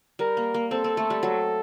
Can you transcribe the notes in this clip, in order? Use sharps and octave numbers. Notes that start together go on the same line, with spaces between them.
G3 A#4
A#3
A#3
C4 A4
C4
A3
G3
F#3